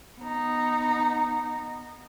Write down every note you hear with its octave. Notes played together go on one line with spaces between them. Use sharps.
B3 D#4